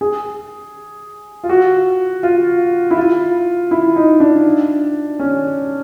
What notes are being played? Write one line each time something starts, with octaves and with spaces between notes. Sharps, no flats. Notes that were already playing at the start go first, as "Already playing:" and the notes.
G#4
F4
F#4
F4
E4
F4
E4
D#4
D4
C#4